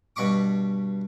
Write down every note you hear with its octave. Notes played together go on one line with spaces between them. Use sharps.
G2 B2 B5 C#6 D6